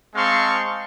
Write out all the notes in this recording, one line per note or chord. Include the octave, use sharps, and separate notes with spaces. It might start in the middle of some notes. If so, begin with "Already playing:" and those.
G#3 C4 F5 A5 C6 C#6